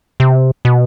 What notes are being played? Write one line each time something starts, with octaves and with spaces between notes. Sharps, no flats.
C3
B2